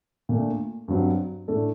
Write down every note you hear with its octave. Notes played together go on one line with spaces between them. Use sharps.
A#2 A3 D4
G2 F#3 C4
A2 A3 D4 A4